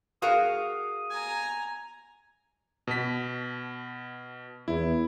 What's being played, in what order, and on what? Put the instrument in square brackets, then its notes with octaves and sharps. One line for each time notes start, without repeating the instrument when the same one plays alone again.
[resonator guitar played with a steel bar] F#4 G#4 A#4 [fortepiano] F5 [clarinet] D#6
[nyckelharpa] G#5 A#5
[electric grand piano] B2 B6
[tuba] E2 [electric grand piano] E4